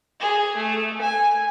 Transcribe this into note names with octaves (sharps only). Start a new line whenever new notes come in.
G#4
A3
G#5